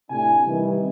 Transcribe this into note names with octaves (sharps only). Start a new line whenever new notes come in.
A2 C3 A3 D4 E4 G#5
C3 D#3 E3 G3